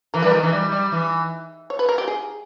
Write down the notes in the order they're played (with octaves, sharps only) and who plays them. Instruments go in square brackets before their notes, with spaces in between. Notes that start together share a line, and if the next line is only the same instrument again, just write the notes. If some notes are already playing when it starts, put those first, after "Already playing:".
[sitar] E3 [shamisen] A#4
[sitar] G3 [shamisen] B4
[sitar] D#3 [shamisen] A#4
[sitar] E3
G3
G3
E3
[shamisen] C#5
B4
A#4
G4
G#4